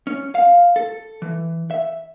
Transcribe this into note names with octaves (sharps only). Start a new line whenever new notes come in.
C#4
F5
A4
E3
E5